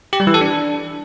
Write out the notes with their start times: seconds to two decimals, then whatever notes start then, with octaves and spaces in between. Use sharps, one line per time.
0.13 G4
0.20 G3
0.27 E3
0.34 A4
0.41 D4